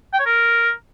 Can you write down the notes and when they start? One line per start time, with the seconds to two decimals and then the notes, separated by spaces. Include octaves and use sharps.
0.13 G5
0.19 C#5
0.26 A#4